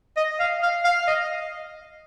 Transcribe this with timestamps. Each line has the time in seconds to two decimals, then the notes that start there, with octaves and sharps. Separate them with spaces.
0.17 D#5
0.40 F5
0.62 F5
0.84 F5
1.08 D#5